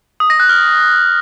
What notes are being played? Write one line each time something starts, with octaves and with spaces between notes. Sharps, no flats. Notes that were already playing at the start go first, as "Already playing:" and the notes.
D#6
A#6
F#6
F6